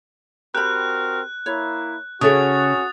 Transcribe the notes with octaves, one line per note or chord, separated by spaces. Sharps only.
C4 F#4 G4 A#4 B5 F#6
A#3 E4 C#5
C#3 C#4 F#4 G#4 A4 E5 D#6 A6